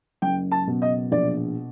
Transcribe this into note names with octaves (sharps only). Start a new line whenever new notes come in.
F#1 G5
A5
B2
D#5
A#1 D5